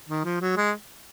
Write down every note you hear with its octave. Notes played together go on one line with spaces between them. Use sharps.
D#3
F3
F#3
G#3